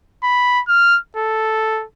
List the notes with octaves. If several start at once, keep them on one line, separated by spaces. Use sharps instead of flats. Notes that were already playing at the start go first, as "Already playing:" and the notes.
B5
F6
A4